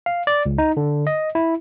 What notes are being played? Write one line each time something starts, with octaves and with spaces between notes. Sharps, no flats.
F5
D5
C#2
D#4
D3
D#5
E4